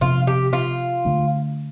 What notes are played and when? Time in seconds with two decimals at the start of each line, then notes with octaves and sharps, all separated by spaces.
0.01 C3 F3 B3 D4 F4
0.27 G4
0.53 F4
1.05 D3 A3 D4